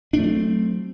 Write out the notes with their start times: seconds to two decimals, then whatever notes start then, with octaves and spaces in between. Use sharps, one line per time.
0.13 D4
0.17 A3
0.20 F#3
0.23 C4